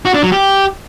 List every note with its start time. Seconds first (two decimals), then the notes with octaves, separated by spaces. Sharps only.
0.05 F#4
0.14 D4
0.23 F#3
0.32 G4